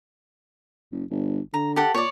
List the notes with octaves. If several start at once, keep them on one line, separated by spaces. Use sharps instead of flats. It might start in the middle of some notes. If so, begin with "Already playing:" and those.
F#1
G1
D3 A#5
G4 A4 F#5
A#2 C#5 D5